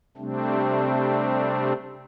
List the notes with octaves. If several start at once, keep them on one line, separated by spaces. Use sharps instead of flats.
C3 G3 A3 C4 D4